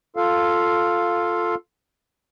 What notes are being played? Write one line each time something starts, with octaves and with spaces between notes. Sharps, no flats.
F4 A4 F5